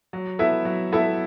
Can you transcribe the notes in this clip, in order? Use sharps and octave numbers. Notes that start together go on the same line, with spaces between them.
F#3
B3 E4 A4 E5
F#3
B3 E4 A4 E5